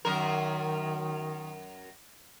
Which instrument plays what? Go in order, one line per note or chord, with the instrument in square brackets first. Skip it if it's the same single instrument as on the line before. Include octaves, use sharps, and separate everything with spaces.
[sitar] F#2 A#4 [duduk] D#3